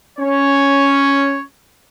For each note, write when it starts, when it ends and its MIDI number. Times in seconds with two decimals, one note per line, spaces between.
0.19 1.42 61
0.19 1.42 73